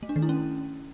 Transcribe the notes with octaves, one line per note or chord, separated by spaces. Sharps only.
A3
D4
D#3
E4
C#4